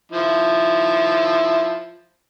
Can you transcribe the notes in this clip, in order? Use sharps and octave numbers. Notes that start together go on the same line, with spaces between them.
F3 E4